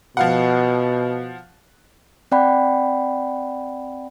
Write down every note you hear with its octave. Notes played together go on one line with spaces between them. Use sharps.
B2 F3 F5 F#5
C4 D5 F#5 G5 B5